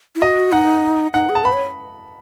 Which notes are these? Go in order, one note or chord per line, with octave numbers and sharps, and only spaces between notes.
E4
F#4 D#5
D#4 F#5
D#4 F#5
G#4
A5
B4 B5
C#5